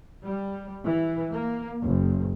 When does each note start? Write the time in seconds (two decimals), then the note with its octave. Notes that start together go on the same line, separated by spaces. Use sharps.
0.24 G3
0.85 E3
1.32 A#3
1.83 F#1